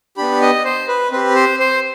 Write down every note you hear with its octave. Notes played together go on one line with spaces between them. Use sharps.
B3 D4 G4 B5
D#5
C5
B4
C4 G4 B4
C5
C5